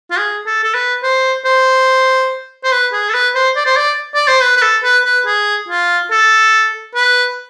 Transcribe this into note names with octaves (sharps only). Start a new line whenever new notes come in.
F4
G#4
A4
A4
B4
C5
C5
C5
B4
G#4
A4
B4
C5
D5
C5
D5
D5
C5
B4
B4
A4
B4
B4
G#4
F4
A4
B4